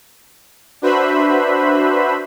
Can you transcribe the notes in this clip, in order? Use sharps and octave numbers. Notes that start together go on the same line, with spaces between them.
D4 F#4 B4 C5 E5 B5